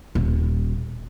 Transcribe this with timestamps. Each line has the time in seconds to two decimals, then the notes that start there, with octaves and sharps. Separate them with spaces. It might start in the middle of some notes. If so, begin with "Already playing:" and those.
0.15 D#1